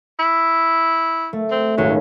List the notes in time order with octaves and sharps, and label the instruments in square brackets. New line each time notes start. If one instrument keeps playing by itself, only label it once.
[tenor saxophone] E4
[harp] A3
[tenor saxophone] C4
[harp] D#1 G#1 C#4 [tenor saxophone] F#3